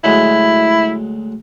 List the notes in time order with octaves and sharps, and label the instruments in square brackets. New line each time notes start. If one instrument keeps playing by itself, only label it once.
[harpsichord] D2 F#3 G#3 [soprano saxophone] E4